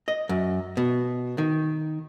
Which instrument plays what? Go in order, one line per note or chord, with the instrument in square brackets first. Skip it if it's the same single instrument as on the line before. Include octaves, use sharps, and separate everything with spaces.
[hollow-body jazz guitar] D#5
F#2
B2
D#3